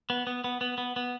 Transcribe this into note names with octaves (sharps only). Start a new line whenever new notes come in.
B3
B3
B3
B3
B3
B3